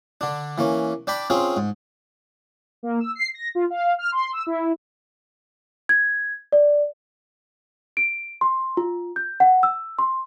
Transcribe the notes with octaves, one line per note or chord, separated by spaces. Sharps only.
D3 D4
E3 A#3 C#4
D4 D5 G5 B5
C4 C#4 F4 G#4
G#2
A#3
E6
C7
A#6
F4
F5
F6
C6
E6
E4
G#6
D5
D7
C6
F4
G6
F#5
E6
C6